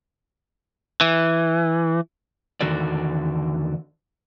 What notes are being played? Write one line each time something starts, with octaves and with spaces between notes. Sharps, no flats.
E3
E2 D3 D#3 F#4 A4 D5